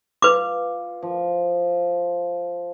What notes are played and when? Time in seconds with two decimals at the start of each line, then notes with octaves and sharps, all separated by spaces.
0.22 F4 B4 D6
1.02 F3